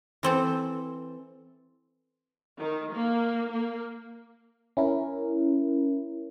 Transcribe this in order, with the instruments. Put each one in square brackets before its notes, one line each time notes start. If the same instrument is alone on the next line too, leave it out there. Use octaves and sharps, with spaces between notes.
[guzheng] E3 C4 A4
[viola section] D#3
A#3
A#3
[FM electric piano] C#4 E4 A#4